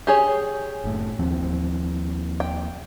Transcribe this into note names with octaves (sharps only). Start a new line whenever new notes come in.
G4 G#4 C#5
F#1 A2
D#2 F3 C4
G5